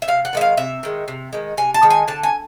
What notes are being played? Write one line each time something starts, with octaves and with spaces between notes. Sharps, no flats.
E5
C3 F5
F#5
D#3 G#3 E5
F5
C3 E5
D#3 G#3
C3
D#3 G#3
C3 G#5
A5
D#3 G#3
G#5
D3 A5
G#5